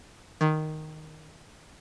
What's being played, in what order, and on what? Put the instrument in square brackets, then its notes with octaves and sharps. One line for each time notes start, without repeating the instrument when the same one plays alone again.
[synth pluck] D#3